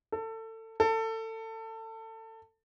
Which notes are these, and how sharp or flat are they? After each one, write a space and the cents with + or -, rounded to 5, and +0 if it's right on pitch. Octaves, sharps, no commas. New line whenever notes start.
A4 +25
A4 +25